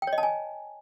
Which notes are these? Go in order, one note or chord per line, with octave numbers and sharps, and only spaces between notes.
G5
C#5
D#5
A5
G#5